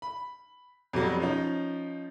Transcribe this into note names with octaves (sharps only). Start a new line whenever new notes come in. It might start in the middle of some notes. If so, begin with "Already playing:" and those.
B5
F2 B2 F#3 G3
F3 C#4 D#4